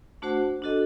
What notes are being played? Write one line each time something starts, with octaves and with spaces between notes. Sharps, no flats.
A3 D4 F#4 C5 F#5
D4 F#4 A4 D#5